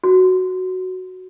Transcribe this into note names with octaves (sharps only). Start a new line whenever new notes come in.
F#4